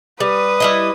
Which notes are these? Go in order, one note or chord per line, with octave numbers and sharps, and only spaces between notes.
G3 B4 D#6
G3 E4 D#5